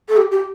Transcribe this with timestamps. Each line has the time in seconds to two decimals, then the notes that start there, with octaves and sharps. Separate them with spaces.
0.09 A4
0.17 G4
0.31 G4